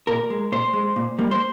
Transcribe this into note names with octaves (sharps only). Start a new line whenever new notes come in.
A#2 A#4
G#3
A#2 C5
G#3
A#2
G3 A#3
C5